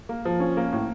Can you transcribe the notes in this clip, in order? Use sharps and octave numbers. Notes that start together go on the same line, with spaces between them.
A#3
F3
C#4
A#3
A2